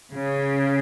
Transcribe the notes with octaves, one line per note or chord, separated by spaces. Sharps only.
C#3